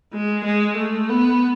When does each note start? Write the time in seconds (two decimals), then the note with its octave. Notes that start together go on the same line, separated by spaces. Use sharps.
0.13 G#3
0.45 G#3
0.77 A3
1.09 B3